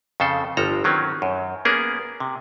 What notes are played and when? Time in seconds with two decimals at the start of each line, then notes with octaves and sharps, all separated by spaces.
0.20 F2 C#3 A4 C5
0.57 G1 F3 A4 A#5
0.84 D#3 F#3 C4 C#4
1.22 F#2
1.65 A#3 B3 C#4 G#4 A#4
2.20 C3